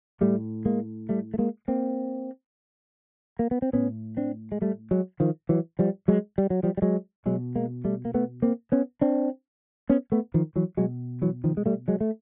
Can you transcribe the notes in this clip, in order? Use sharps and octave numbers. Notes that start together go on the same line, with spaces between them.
A2 G3 A3
G#3 A#3
G3 A3
A3
G#3 A#3
A#3 C4
A#3
B3
C4
A2 B3 C#4
C4 D4
G#3
G3 A3
F#3 G#3
D#3 F3
E3 F#3
F3 G3
F#3 G#3
G3
F#3
F3 G3
G3
F#3 G#3
B2 F#3 G#3
G#3 A#3
G3 A3
A#3
A3 B3
A#3 C4
B3 C#4
C4 D4
B3 C#4
A3 B3
D#3 F3
E3 F#3
B2 F#3 G#3
E3 F#3
D#3 F3
G#3
G3 A3
F#3 G#3
A3